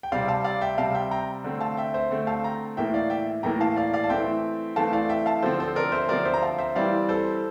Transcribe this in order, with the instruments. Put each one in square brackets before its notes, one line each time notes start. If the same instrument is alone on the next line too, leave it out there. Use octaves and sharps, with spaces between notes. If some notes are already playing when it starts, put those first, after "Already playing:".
[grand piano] G5
C3 G3 C4 D5 F5
F5 A5
D5 F5
E5 G5
C3 G3 C4 F5 A5
E5 G5
G5 A#5
D3 A3 C4
F5 A5
E5 G5
C5 E5
D3 A3 C4
F5 A5
G5 A#5
A2 E3 A#3 E5 G5
D5 F5
E5 G5
A2 E3 A#3 G5 A#5
F5 A5
D5 F5
D5 F5
A5
E3 A3 C4 E5 G5
E3 A3 C4 F5 A5
D5 F5
E5 G5
F5 A5
D3 F3 C4 A4 C5
A4 C5
A#4 D5
C5 E5
D3 F3 C4 A#4 D5
C5 E5
A#5
F5 A5
C5 E5
E3 G3 C4 D5 F5
A4 C5